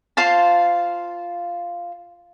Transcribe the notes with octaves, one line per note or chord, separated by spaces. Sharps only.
F4 C5 F5 A5